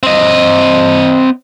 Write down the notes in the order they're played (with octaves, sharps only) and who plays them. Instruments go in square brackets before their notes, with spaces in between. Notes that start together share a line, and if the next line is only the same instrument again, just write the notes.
[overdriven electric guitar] C4 D#5